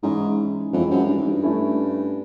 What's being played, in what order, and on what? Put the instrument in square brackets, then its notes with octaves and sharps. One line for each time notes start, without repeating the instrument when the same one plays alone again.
[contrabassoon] G#2 [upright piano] E3 G#3 C#4 E4
[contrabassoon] F2 [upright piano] E3 G#3 C#4 E4
[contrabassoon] F#2
G2
G#2
G2
[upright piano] A3 C#4 E4 A4